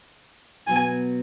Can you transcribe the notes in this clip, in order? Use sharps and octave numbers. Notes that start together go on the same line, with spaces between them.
B2 F#3 B3 G#5